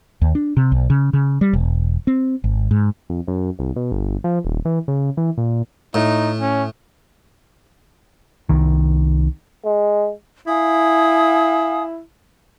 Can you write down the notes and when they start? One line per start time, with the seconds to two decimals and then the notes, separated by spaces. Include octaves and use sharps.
0.21 D#2
0.35 D4
0.57 C3
0.72 B1
0.90 C#3
1.13 C#3
1.41 G3
1.53 E1
2.07 C4
2.44 G#1
2.71 G#2
3.09 F2
3.28 F#2
3.59 C2
3.76 B2
3.92 G1
4.24 F3
4.45 D#1
4.65 E3
4.88 C#3
5.17 E3
5.38 A#2
5.94 A2 D#4
6.40 C#4
8.49 C2 D#3
9.65 G#3
10.47 E4 F5 G#5 D#6